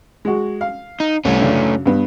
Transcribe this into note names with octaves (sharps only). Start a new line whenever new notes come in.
G#3 F#4
F5
D#4
C2 A3 C#4
F#2 C#3 D4
G2 B3